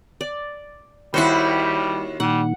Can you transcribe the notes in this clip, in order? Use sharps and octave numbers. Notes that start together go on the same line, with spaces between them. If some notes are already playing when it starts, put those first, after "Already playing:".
D5
D#2 G3 E4 F#4 C5 G5 B5
A#2 D#3 G3 F#5